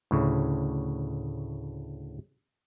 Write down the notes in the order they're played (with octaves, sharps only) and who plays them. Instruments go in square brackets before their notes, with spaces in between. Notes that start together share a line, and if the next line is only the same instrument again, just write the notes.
[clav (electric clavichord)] D2 A2 C#3